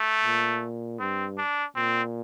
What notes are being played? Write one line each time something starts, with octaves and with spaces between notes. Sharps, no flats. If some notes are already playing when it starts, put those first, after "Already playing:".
Already playing: A3
A#2
G2 C4
D4
A#2 C4